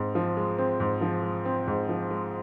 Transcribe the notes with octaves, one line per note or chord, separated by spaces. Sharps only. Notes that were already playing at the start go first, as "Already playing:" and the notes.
Already playing: G#2 G#3 C4
F3
G#3
C4
G#2
F3
G#3
C4
G#2
F3
G#3